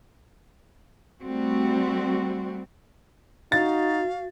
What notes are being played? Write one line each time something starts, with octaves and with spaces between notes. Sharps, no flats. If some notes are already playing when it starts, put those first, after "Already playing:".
G3 A3 C4 F#4
D#4 F#4 F5 A6